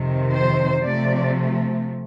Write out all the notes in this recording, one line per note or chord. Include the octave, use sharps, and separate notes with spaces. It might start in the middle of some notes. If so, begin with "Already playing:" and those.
Already playing: F2 C3 D#3
C5
C3 F3 A3 D5